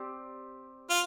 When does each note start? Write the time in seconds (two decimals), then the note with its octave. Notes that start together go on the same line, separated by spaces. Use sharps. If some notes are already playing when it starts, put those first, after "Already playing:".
Already playing: C4 G4 D5
0.90 F4